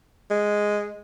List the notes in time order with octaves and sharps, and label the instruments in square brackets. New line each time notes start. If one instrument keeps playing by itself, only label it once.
[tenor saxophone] G#3